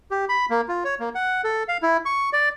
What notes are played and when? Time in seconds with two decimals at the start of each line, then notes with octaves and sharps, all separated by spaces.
0.11 G4
0.29 B5
0.50 A#3
0.68 F4
0.84 C#5
1.00 A#3
1.15 F#5
1.44 A4
1.68 F5
1.82 E4
2.05 C#6
2.33 D5